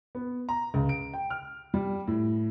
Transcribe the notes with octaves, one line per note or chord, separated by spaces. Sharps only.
B3
A#5
C#2
D7
G5
F6
G3
A2